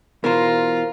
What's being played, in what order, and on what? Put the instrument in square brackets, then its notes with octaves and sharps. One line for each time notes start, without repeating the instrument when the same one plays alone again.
[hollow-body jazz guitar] B2 E3 [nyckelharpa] F4 [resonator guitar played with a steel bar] A#4 C5